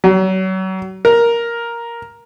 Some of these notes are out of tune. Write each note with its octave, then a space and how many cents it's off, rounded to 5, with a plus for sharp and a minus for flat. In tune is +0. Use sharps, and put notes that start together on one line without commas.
F#3 +35
A#4 +5